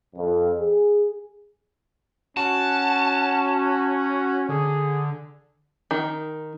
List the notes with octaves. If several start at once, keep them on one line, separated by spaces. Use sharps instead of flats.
F2
G#4
C#4 F#4 A5
D3 G#4
D#3